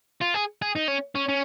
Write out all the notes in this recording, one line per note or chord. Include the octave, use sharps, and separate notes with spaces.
F4
G#4
G#4
D#4
C#4
C#4
C#4